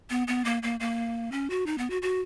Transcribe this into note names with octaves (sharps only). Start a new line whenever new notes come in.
B3
B3
A#3
A#3
A#3
C#4
F#4
D#4
B3
F#4
F#4